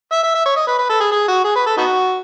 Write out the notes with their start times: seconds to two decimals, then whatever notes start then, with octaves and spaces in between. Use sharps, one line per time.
0.12 E5
0.23 E5
0.35 E5
0.46 C#5
0.56 D#5
0.67 B4
0.78 B4
0.89 A4
1.00 G#4
1.12 G#4
1.28 F#4
1.44 G#4
1.55 B4
1.66 A4
1.77 B3 D#4 F#4